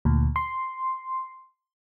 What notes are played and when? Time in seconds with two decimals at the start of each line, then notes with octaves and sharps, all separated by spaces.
0.05 D2 A#2
0.36 C6